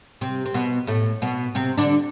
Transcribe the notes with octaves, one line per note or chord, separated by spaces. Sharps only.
C3 C4
C4
B2 B3
A2 A3
B2 B3
C3 C4
D3 D4